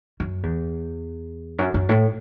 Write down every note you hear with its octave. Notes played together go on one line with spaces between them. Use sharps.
F#2
E2
F#2
F#2
A2